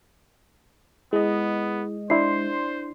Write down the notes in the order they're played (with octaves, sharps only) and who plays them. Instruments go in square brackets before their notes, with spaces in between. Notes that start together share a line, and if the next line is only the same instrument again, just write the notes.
[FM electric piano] G#3 D#5 [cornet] B3 [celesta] E4
[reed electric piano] D4 E4 [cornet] C5 [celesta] D5 C6 C7